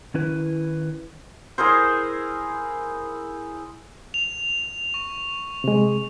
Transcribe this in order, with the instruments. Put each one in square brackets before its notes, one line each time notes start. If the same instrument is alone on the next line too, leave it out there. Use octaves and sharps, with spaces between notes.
[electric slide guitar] D#3 C#4 E4 B4
[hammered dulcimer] E4 G#4 A#4 C5
[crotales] F7
C#6
[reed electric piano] C3 G#3